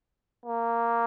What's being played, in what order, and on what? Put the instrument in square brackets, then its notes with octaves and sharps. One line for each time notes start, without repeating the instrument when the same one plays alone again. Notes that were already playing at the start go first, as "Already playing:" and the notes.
[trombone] A#3